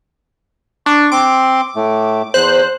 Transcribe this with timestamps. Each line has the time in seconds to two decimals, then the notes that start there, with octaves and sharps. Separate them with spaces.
0.86 D4 C#6
1.12 C4 C6 D6
1.76 A2 A3
2.34 E2 C5 F#6